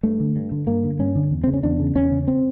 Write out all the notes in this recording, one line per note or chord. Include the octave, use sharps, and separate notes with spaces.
G2 A3
D3
G2
D3
G2 A#3
D3
G2 C#4
D3
E2
C#3 C4
C#4
E2 D4
C#3
E2 C#4
C#3
C4